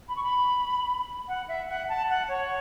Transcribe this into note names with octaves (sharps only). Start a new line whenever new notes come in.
B5
C#6
B5
F#5
E5
F#5
A5
F#5
C#5